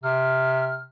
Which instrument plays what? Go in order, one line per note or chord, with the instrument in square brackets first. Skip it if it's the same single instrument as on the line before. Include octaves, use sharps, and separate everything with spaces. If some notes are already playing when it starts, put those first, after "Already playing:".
[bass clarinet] C3 [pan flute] F6